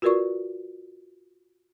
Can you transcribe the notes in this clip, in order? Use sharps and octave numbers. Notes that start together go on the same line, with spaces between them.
F4 F#4 A#4 B4 D5 C#6